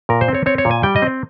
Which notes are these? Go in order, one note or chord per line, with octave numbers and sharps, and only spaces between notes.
A#2 A#4
C5
C4
C#5
C4 C#5
C#5
A#2
G#5
G3 G5
D#5
C4